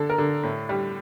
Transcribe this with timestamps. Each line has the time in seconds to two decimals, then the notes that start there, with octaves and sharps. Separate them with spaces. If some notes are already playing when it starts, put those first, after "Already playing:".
Already playing: D3 A4
0.10 A#4
0.18 D3
0.43 A2
0.69 G3